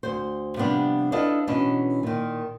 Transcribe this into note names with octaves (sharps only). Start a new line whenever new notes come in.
D2 C5
C3 F3 G3 B3 D4
D4 E4 F4 A4 B4 D#5
B2 E3 C#4 D4 D#5
A#2 D#3